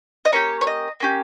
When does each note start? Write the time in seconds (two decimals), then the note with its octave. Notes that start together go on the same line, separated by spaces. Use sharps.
0.25 D#5
0.32 A#3 C#4 G4 C#5
0.61 C#5
0.67 D#5
1.00 A#3 C#4 G4